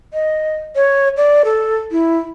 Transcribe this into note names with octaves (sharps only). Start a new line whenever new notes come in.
D#5
C#5
D5
A4
E4